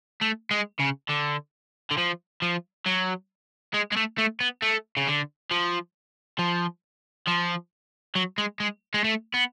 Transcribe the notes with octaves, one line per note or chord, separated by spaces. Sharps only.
A3
G#3
C#3
D3
D3
F3
F3
F#3
G#3
G#3
A3
A3
B3
A3
C#3
D3
F3
F3
F3
F#3
G#3
G#3
G#3
A3
B3